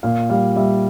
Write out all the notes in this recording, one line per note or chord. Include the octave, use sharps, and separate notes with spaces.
A#2 F5
G3 F5
G3 E5